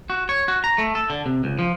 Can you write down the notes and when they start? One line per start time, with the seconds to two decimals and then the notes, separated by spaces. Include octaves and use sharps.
0.10 F#4
0.29 C#5
0.48 F#4
0.64 A#5
0.78 A3
0.95 A4
1.10 D3
1.26 C3
1.44 C#2
1.59 F3